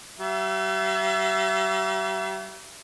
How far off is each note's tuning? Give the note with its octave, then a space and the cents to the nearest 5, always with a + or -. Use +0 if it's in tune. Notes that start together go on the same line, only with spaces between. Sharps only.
G3 -45 E5 +35